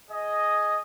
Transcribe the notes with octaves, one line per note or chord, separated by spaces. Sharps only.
G#4 D#5